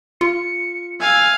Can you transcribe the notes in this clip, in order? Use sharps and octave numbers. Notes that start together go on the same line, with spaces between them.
F4 C#7
F5 G#5 E6